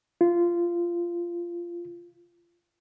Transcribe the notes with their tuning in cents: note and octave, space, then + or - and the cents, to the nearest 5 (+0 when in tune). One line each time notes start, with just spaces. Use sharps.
F4 -15